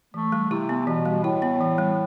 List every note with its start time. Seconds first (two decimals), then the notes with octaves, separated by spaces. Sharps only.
0.14 E3 A3
0.32 G3
0.51 C3 E4
0.69 B3
0.87 B2 E3
1.05 G3
1.24 A2 E4
1.42 B3
1.61 E3
1.78 G3